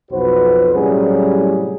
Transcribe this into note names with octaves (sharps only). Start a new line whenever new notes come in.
B1 F2 F#4 B4 C5
A2 C3 F#3 G3 C#4 G#4